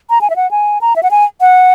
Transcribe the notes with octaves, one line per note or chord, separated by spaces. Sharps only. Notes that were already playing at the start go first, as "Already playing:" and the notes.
A#5
G#5
E5
F#5
G#5
A#5
E5
F#5
G#5
F#5